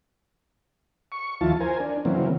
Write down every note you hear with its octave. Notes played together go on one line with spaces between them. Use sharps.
C#6
D#2 F3 E4 F4 A5
A#4 C5 G#5
D4
C#3 E3 F#3 A#3 C4